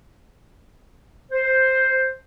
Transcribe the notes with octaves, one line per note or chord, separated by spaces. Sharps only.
C5